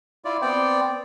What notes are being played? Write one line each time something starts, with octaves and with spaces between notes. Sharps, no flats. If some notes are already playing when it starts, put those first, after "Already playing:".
E4 F4 D5
B3 C4 D5 G5